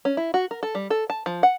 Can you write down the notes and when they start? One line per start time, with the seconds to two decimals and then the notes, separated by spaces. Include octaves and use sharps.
0.05 C#4
0.17 E4
0.34 F#4
0.51 A#4
0.63 A4
0.75 G3
0.90 A4
1.10 A5
1.26 F3
1.43 F#5